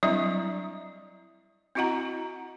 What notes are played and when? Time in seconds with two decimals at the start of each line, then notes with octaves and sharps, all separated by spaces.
0.03 F#3 G3 C4 D4 E4 E5
1.75 C4 E4 F#4 D#5 F#5 A#5